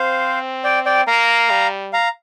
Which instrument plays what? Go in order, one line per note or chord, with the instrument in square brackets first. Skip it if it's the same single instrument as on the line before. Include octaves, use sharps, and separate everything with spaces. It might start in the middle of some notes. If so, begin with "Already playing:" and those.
Already playing: [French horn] C4 [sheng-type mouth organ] C5 F5
[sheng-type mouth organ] D5 G5
D5 G5
[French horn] A#3 [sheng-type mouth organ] F5 A#5
[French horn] G3
[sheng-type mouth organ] F5 A#5